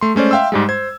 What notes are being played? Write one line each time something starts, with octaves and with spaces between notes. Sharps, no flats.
A3 C6
G#3 A3 C#4 C5 D5
E5 F5 G5 C6 E6
G#2 G3 G#3
C5 G#6